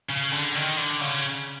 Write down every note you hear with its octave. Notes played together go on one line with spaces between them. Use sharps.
C#3
D3
D#3
D3
C#3